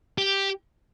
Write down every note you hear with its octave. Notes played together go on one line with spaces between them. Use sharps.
G4